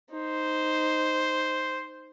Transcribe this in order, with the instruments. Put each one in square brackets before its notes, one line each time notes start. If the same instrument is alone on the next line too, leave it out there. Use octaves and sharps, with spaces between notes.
[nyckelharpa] D#4 [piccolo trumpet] C5